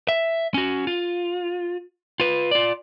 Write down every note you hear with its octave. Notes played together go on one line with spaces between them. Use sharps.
E5
C#4 F#4
F4
F4 B4
F4 D5